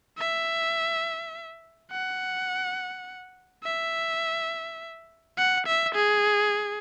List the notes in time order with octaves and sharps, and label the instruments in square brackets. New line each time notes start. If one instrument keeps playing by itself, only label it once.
[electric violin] E5
F#5
E5
F#5
E5
G#4